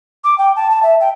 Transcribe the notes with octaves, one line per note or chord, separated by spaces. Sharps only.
D6
G5
A5
A5
E5
G5